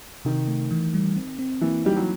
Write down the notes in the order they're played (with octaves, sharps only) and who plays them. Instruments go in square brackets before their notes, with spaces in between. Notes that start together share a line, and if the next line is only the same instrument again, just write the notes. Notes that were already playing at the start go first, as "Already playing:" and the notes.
[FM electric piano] C3 [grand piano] D#3
[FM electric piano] A3
E3
G3
C4
C4
[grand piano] E3 [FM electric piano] A#3
[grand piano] G3 [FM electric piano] D#4
[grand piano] F#3